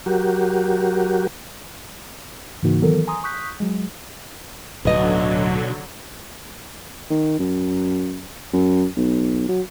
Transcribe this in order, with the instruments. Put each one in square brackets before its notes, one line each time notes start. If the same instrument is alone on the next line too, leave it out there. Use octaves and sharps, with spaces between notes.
[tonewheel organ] F#3 F#4 G4 A#4
[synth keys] G#2 C#3 E3 A#3 D#4 F#4
D#3 E3 F#3 B3 A4 A#4
G#5 A#5 C6 D#6
C#6 D#6 F#6 G6 B6
F#3 G#3
[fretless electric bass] D1 [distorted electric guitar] B1 [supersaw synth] D3 F#3 [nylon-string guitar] B4 D#5
[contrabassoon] D#3
F#2
F#2
B1
F#3